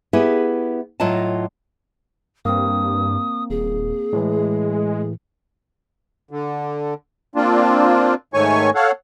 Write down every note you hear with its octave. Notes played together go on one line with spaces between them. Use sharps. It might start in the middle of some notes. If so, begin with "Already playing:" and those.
B3 E4 G4 G#4 B4
A2 F#3 F4 D#5 A5
G2 A#3 C4 D#6
D#1 G#4
A2 E3 G#3
D3
A#3 C4 D4 F4
G#2 D#3 A3 C#5 G#5 C#6
A4 C#5 F5 F#5